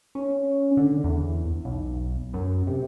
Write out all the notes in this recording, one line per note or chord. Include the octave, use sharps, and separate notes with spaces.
C#4
D3
E2
B1
F#2
C3